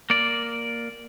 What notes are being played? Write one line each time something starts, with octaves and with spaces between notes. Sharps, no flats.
A#3 D5